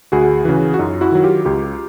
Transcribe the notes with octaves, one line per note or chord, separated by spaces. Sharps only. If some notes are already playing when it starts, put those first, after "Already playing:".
D2 F#4 G#4
C#3 E3
F#4
F#2 D#4 F4
E4 F#4
D#3 F#3
F4 G4
C#2 F4 G4